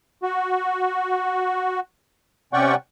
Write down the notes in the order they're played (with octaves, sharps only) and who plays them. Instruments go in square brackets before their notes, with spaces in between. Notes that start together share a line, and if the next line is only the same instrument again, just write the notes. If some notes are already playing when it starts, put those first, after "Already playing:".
[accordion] F#4
C3 C#4 D5 F#5 G5 C#6